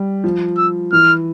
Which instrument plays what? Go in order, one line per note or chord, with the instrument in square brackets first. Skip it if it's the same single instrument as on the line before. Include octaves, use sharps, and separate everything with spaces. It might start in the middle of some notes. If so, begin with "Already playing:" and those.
Already playing: [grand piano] G3
F3
[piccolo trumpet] E6
[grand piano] E3 [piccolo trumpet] F6